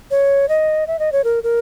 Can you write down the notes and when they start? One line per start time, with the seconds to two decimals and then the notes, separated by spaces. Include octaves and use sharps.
0.11 C#5
0.49 D#5
0.87 E5
0.99 D#5
1.12 C#5
1.24 A#4
1.43 A#4